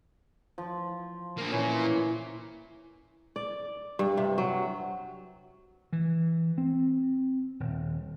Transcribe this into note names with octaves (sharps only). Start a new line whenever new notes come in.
F3
A#3 D4
A#2 E3 C#4
D5
G2
C3
F#3
E3
C4
D#1